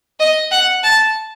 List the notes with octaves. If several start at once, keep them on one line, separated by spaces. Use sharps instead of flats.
D#5
F#5
A5